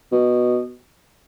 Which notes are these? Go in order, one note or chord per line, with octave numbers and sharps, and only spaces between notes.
B2